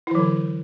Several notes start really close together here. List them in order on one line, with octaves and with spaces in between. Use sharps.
E4 E3 F#3 D3